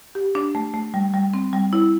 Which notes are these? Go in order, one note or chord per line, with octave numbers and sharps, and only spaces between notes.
G4
D4
A3
A3
G3
G3
C4
G3
E4